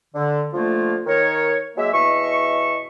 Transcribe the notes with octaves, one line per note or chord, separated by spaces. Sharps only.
D3
D3 F3 A3 A#3 F4
D#3 A#4 C#5
F#3 G#3 A#3 E5
E2 B2 D#5 E5 C#6